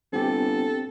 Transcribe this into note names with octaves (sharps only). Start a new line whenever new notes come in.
G1 C4 G4 A4